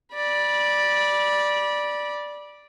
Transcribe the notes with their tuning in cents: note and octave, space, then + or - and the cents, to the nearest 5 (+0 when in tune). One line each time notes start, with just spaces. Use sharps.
D5 +0 B5 -25